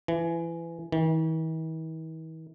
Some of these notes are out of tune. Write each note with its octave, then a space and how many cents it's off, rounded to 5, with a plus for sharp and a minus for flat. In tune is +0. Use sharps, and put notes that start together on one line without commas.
E3 +25
E3 -45